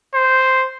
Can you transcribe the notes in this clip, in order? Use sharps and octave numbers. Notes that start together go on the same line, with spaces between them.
C5